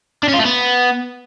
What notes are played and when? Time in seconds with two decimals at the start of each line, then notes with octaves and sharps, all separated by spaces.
0.23 D4
0.28 C#4
0.33 F4
0.39 A3
0.44 B3